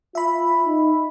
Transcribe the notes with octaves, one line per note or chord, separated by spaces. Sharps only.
F4 E5 B5
D#4